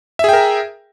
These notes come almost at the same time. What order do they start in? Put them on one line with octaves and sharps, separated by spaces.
E5 G#4 G5 A#4